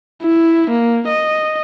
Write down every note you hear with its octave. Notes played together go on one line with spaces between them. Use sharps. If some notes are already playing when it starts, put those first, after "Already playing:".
E4
A#3
D#5